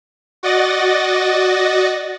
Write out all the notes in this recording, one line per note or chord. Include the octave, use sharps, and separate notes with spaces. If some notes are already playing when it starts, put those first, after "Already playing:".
F#4 D5 D#5 F#5 A6 A#6